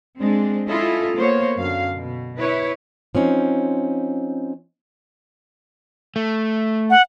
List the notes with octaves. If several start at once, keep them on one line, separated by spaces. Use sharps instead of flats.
G#3 C4 D4
C#4 E4 F4 A4 D#5
A#3 B3 C5 C#5
F#2 D3 F5
B2
E4 B4 C#5
F3 C4 C#4 D#4
A3
F#5